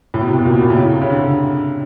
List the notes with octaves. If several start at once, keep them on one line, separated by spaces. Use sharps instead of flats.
A2
B2
C3
B2
A#2
B2
A#2
A2
C#3
C3
C#3
D3